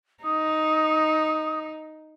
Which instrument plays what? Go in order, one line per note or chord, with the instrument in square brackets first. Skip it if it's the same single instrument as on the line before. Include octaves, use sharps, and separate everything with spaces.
[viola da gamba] D#4 [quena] D#6